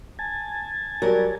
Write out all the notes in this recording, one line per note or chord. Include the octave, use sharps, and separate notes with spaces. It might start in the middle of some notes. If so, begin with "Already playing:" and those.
G#5 A5
F#3 G3 A#4